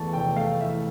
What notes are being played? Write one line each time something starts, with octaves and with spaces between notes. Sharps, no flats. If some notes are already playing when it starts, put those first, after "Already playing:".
Already playing: E2 E3 A3 A5 C#6
F1 G5
A3 F5
E3 E5